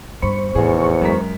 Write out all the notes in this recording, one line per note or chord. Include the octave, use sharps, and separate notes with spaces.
E2 G2 C5 B5 C#6
F1 E2 A2 G#4
F#2 G3 G#3 A#4 B6